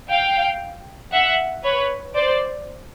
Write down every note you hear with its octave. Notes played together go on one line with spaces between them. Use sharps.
F5 G5
E5 F#5
B4 C#5
C5 D5